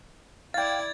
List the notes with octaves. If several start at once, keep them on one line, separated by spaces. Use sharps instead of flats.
E4 D5 F5 G5 G#6 A6